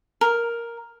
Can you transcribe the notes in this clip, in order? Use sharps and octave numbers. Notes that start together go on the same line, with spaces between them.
A#4